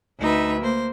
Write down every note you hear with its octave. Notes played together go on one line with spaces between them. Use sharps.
D2 D#4 B4 E5
A#3 C5